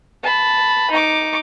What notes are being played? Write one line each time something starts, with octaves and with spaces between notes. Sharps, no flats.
A5 B5
D#4 D6